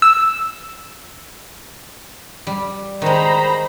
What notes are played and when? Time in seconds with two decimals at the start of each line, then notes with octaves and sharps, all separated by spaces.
0.02 E6
2.47 G3
3.02 D#3 G#3 C5 A#5 B5